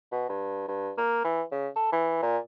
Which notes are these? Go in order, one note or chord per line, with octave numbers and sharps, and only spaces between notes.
B2
G2
G2
A#3
E3
C#3
A4
E3
A#2